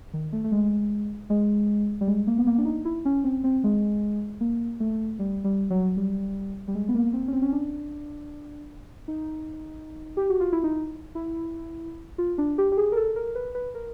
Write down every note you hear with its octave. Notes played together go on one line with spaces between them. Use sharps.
D#3
A3
A3
G#3
G#3
G3
G#3
A#3
B3
A#3
D4
D#4
E4
C#4
C4
C4
G#3
A#3
A3
G3
G3
F#3
G3
G3
G#3
B3
A#3
C4
C#4
C4
C#4
D4
D#4
G4
F#4
F4
E4
D#4
E4
F4
D4
G4
G4
G#4
A#4
A4
A#4
B4
B4
A#4